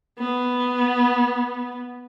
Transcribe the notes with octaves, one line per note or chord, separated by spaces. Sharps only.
B3